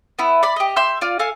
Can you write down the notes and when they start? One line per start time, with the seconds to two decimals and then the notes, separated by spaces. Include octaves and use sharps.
0.19 B3 E4
0.43 D5 B5
0.56 G4 D#5
0.76 E5 C6 E6 G6
1.01 F4 D5
1.19 A4 F5 G#5